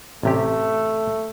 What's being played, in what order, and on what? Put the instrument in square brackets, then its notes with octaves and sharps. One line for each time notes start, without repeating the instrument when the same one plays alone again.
[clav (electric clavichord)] A1 C3 G4 [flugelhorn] A3